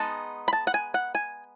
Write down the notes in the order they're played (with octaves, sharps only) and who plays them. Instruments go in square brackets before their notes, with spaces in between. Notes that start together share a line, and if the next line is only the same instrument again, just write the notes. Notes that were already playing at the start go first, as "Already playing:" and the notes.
Already playing: [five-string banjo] G#3 B3 D#4 A5
B5
A5
F#5
G#5
F#5
G#5